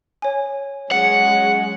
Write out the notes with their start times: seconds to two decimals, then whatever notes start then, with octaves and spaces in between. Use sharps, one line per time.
0.22 C#5 G#5
0.91 F#3 G#3 C#4 F#5 C#7